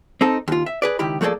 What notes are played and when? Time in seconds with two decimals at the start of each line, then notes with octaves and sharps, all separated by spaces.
0.21 C4 D#4 A4
0.48 D#2 F4
0.66 E5
0.82 G#4 B4 D5
0.99 C#2 D#3 E4 G4 B5
1.21 F3 A3 A#3 G#4 A4 D5